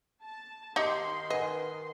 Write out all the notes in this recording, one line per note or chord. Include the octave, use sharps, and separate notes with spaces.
A5
D#3 D#4 G4 D#5 C6
B4 D#5 F#5 G#5